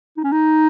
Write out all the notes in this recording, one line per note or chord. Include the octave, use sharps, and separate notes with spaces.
D#4
C#4
D#4